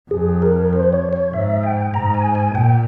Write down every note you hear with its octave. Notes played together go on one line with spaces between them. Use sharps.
F2 G#4
A#4
C5
C#5
C#5
G#2 E5
G5
G#2 A#5
G#5
G#5
A#2 G5